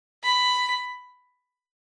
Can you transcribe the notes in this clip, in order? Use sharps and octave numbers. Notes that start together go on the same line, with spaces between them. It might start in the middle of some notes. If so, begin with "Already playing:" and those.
B5